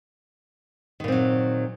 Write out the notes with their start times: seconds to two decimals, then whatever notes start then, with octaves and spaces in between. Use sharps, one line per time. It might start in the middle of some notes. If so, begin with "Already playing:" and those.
1.00 D#3
1.04 A#2
1.08 C4
1.12 F#3